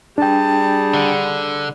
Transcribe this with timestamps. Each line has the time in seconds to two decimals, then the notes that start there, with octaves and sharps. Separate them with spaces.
0.18 G3 D4 G#4 G5 A5
0.94 D3